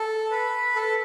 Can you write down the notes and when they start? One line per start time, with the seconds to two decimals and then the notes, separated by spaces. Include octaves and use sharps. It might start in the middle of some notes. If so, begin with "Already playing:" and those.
Already playing: A4
0.31 B4
0.76 A4